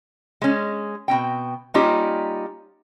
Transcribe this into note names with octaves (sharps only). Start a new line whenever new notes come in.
G#3 C#4
B2 C4 G5
G3 A#3 C#4 D#4 F4 G4